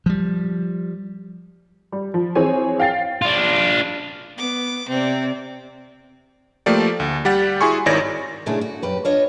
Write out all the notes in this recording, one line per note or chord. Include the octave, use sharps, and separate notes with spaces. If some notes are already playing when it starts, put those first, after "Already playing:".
F3 G3
G3
F3
E3 C4 G#4 C5 C#5 G#5
F5 G5 A6 C7
D4 F4
B3 D6
C3 C4 D5
F3 A3 A#3 G4 D5
D2
G3 G4 F#5 A6
E4 F#4 G#4 G#5 C6 C#6
G#1 D#3 E4 C#5 D5 A#6
A#2 C#3 G#3 A3 D4 E4
F#4
F#2 G4 B4
D4 F4 B4 C#5 D#5